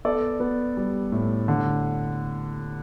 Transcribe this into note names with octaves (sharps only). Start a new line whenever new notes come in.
B3 A4 D5
B3
G3
A2
D3